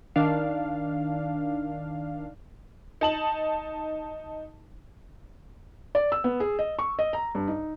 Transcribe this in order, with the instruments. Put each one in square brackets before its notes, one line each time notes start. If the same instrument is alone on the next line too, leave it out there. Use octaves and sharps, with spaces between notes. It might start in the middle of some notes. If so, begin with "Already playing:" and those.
[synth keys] D#3 D4 F5
[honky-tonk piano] D#4 A5 F#7
[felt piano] D5
E6
B3
G#4
D#5
C#6
D#5
A#5
G2
D#4